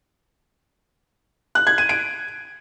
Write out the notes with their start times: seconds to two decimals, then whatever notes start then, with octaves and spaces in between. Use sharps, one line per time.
1.55 F#6
1.67 G#6
1.78 D#7
1.89 D7